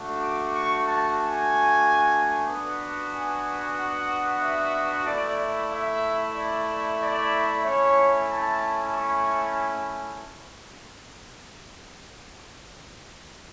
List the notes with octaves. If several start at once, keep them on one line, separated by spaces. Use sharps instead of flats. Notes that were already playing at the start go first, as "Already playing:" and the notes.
Already playing: A3 D4 F#4
D6
C#6
A5
G#5
B3 D4 F#4
G#5
F#5
E5
A3 E4 D5
D5
E5
D5
D5
A3 C#4 E4 C#5
A5
C#6